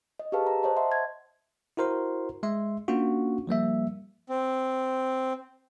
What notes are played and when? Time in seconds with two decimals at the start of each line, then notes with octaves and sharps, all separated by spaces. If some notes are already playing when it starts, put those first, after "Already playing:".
0.19 D#5
0.32 G4 G#4 A#4 B4 F5 A5
0.47 A#5
0.63 C5 C#5 D#5 A5
0.76 E5 F#5 C6
0.92 G#6
1.77 E4 F#4 A#4 C5 C6
2.43 G#3 E5 C6
2.88 A#3 C#4 D4 F4 F#4
3.47 F3 G3 A#3 E5
4.29 C4